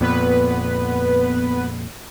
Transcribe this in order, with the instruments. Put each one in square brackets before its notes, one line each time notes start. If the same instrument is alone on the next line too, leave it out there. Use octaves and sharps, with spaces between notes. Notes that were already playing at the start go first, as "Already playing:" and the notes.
[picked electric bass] F2 A#2 [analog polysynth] B3 B4